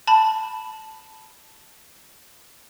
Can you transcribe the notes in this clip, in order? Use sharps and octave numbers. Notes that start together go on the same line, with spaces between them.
A5 B5